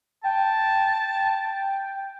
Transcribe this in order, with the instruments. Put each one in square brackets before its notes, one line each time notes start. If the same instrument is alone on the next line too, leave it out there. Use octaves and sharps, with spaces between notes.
[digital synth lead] G5 [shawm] A5